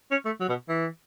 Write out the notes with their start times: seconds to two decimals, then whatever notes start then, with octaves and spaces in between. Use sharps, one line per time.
0.11 C#4
0.25 A3
0.40 F#3
0.49 B2
0.69 E3